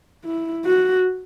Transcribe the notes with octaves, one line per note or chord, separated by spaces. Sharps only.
E4
F#4